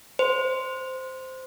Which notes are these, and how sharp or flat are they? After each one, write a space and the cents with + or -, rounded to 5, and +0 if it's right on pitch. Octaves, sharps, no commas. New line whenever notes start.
C5 -10